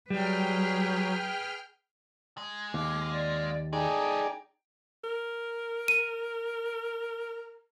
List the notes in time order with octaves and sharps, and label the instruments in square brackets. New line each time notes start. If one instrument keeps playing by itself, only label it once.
[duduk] F#3 [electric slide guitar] G3 [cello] G#4 B4 [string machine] G5 F6
[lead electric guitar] G#3
[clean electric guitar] D#2 [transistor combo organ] F5 [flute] D6
[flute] D5
[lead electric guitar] G#3 A4 [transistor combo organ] D#4 G#4 D5 [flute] G5
[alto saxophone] A#4
[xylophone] D#7